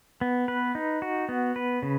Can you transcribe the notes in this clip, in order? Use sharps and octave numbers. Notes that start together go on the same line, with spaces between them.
B3
B4
D#4
F#4
B3
B4
C#3